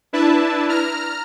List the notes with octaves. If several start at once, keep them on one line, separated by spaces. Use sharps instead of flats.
D4 E4 B4 E5 A5
A#5 F6